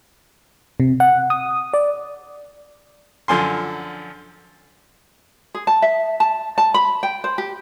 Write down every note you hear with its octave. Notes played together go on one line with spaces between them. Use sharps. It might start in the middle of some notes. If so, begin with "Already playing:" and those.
C3
F#5
D#6
D5
F#2 D3 F3 G#5 C6
G#4
A5
E5
A5
A5
B5
G5
C5
G4